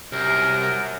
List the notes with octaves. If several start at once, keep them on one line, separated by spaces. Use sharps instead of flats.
C2 F#2 G4 A#4